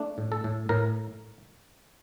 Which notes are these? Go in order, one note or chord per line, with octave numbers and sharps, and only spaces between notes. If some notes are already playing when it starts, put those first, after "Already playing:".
Already playing: A3 D4
A2
A4
A2
A2 A#4